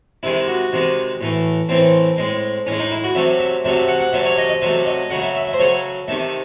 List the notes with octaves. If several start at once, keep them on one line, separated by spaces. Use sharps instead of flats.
C3 D#3 G#3 E4
F#4
C3 D#3 G#3
A2 E3 A3
A2 E3 A3 C4
A2 G#3
A2 G#3 C#4
D#4
E4
F#4
C3 F#3 A3 E5
E5
C3 F#3 A3 E5
E5
F#5
F#5
C3 F#3 A3 E5
C#5
D#5
D#5
C3 F#3 A3 E5
D#5
C#3 F#3 A3 F#5
E5
E5
E5
C5
C#3 F#3 A3 C#5
C3 D#3 A3 E5